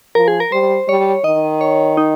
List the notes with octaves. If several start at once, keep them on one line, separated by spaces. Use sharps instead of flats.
F3 A#4
G#4
A#4
G3 C5
G3 C#5
D#3 D#5
C#5
D#4